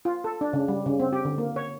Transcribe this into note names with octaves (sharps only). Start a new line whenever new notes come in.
F4
A4
D4
C#3
G3
C#3
C4
G4
D3
A#3
C#5